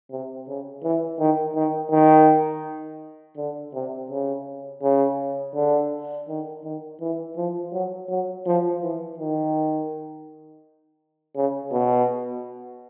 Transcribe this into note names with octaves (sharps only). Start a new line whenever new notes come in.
C3
C#3
E3
D#3
D#3
D#3
D3
C3
C#3
C#3
D3
D#3
D#3
E3
F3
F#3
F#3
F3
E3
D#3
C#3
B2